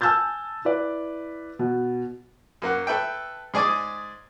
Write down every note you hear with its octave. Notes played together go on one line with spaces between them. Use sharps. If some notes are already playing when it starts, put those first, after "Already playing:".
G#5 A5 E6 F6 G6 A6
E4 B4 D5
B2
F#2 A#3 F#5
A4 B4 E5 G5
G#2 G#4 D5 G#5 D6 D#6